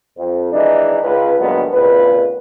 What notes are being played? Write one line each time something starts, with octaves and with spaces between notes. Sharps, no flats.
F2
D#3 E3 G#3 D4 D#4
C#2 B4
D2 G2 A#2 F#3 G#3 B3
G#1 C#2 A#2 B4